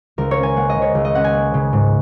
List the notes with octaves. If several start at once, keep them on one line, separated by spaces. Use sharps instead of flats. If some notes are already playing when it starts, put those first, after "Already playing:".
C#2 A#4
C#5
C#4
G#5
A#3 F#5
D#5
C#3
C#5
C#2
D#5
C#4 F#5
G#5
A#3
C#3
G#2